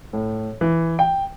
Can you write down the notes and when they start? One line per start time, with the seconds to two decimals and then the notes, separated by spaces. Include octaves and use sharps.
0.13 A2
0.61 E3
0.99 G5